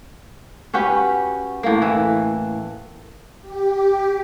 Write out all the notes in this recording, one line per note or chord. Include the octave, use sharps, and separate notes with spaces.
C#4 F#4 G4 B4
A2 A#3
E3
G4